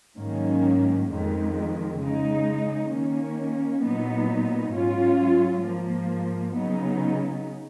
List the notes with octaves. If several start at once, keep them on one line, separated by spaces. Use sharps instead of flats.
G#2 D#3 F#3 A#3 C#4
F2 D#3 G#3
C#3 G#3 D#4
D#3 A#3 C#4
A#2 F#3 B3 D#4
G#2 F#3 C#4 F4
G#2 F3 A#3
C#3 F#3 B3 D#4